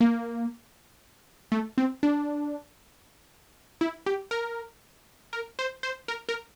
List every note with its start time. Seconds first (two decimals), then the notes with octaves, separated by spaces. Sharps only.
0.01 A#3
1.52 A3
1.78 C4
2.03 D4
3.81 E4
4.06 G4
4.31 A#4
5.33 A#4
5.59 C5
5.83 C5
6.08 A#4
6.29 A#4